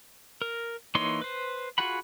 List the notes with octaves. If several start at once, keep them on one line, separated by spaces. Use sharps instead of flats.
A#4
E3 A#3 D#4 C#5 C6
B4 C5
F4 F#4 G#4 F#5 B5